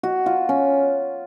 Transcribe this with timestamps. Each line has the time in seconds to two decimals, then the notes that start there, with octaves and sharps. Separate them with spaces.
0.03 F#4
0.26 F4
0.49 C#4